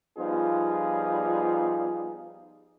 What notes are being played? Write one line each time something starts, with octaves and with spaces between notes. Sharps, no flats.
F3 G3 B3 D#4 F4 G#4